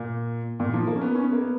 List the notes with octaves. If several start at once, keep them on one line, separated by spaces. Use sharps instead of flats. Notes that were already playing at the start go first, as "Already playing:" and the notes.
Already playing: A#2
A#2
F3
A#3
C#4
B3
C#4
B3
A#3
B3